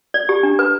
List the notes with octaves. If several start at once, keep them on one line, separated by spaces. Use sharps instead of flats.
D5
G4
D4
B4